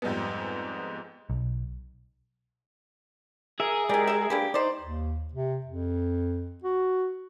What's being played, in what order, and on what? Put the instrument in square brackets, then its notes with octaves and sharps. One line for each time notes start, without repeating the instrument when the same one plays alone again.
[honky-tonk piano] F2 G#2 G3 G#3 B3
[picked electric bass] B1
[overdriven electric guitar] G#4 [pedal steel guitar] A#4 E5
[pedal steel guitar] G#3 G4 A#4 [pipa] E4 D5
[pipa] D#5 E5
[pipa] A#3 D4 B4 [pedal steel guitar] G4
[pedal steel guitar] D#4 [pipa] C5 D5
[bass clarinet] D#2
C3
F2
F#4